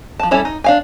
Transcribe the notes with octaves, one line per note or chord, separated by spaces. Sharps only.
F3 A5
G3 C#4 E4 A4 C#5
D#4
D4 F5 G#5